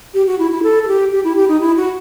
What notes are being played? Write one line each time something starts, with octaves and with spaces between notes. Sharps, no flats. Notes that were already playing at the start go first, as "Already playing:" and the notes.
G4
F#4
E4
E4
A4
A4
G4
G4
E4
G4
D#4
E4
F#4